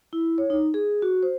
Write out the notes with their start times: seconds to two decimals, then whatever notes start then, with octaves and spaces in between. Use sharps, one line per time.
0.13 E4
0.38 C#5
0.50 D#4
0.74 G#4
1.02 F#4
1.23 C5